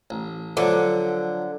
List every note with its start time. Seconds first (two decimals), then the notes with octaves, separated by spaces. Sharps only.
0.10 A1
0.57 D3 F3 F#3